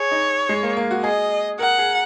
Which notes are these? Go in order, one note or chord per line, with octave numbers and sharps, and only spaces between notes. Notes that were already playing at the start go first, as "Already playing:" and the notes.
Already playing: G#4 C#5
D#4
G#3
A#3
A#3
F#4
G#4 D#5
A#4 F#5
G#4